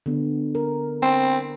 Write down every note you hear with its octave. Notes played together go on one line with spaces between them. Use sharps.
D3 B3
A#4
C4